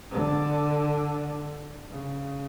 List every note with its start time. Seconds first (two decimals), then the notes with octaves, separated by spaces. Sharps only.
0.11 D3
1.90 C#3